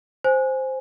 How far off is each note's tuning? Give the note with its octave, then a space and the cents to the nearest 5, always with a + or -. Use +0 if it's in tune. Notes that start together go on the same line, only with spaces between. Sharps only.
C5 +0 G#5 +0